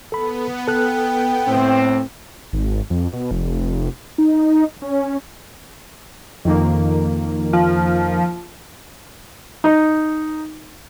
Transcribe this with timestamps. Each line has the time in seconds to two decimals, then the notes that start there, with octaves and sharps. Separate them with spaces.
0.12 B3 A4 B5
0.68 A4 G5 F#6
1.47 A2 C4
2.53 G#1
2.90 F2
3.13 B2
3.31 F1
4.18 D#4
4.82 C#4
6.45 F2 D#3 A#3
7.53 F3
9.64 D#4